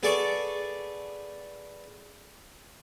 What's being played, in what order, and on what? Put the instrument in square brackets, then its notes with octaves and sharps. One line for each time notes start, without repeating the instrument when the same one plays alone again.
[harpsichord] B3 G#4 A4 D5 A5 C#6